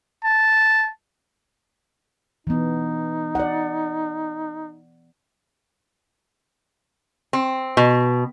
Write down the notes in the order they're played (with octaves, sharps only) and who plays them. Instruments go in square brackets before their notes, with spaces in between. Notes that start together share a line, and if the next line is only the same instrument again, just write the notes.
[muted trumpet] A5
[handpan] E3 B3 [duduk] D#4
[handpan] D5 F#5
[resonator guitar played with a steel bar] C4
B2